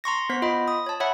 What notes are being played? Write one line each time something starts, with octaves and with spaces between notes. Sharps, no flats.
A#5 C6 C#6 A#6
B3 C5 B6
F4 D#5 B5
D#6
C#5 A5
C#5 E5 F#5 B5